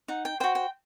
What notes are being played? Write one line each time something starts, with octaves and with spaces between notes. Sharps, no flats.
D#4 F#5
G5
F#4 C5 G5
G5